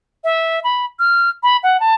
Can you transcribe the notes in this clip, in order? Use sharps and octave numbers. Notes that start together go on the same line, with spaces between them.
E5
B5
F6
B5
F#5
A5